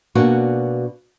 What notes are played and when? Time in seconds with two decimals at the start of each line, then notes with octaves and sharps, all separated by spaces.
0.15 B2 A#3 C#4 D4 F#4